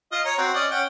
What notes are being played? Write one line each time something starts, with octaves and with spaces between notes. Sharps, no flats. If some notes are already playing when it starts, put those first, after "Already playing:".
F4 D#5
C#5 A#5
C4 F#4
C#4 D5 D#5
C#4 F#5 G5